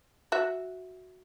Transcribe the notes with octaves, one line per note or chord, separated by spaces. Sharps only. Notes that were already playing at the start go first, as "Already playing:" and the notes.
F#4 E5